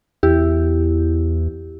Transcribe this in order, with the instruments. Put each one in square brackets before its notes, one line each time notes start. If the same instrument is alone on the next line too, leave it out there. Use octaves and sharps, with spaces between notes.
[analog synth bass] E2 [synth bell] E4 G4